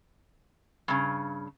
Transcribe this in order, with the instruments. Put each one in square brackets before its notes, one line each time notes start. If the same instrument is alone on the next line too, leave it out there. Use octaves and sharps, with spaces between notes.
[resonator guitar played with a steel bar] G2 C#3